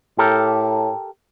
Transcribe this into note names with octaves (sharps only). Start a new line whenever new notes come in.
A2 G4 A4 A#4